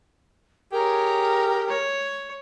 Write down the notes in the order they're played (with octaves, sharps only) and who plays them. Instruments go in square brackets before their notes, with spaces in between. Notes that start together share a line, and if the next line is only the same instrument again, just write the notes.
[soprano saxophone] G4 [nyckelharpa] G#4 C#5 [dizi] A#4
[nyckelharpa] C#5